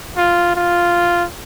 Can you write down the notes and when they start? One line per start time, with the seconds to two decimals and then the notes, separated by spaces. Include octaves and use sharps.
0.17 F4
0.56 F4